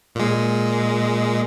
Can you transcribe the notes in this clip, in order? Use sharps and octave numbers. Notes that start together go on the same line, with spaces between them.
A#2 G#3